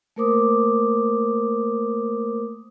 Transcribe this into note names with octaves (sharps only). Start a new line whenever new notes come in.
A3 A#3 A#4 C5 D6 D#6